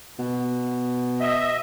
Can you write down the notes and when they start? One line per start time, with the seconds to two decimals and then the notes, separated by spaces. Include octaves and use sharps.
0.19 B2
1.20 D#5 E5